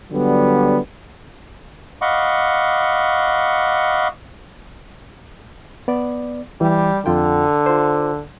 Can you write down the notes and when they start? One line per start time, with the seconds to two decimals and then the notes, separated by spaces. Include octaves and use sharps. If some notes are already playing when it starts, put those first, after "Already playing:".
0.12 D3 F#3 G3 B3
2.02 D#5 F5 F#5 B5 C#6 D6
5.88 B3 D5
6.61 E3 G3
7.06 F2 D3 F4 G5
7.66 F4 C5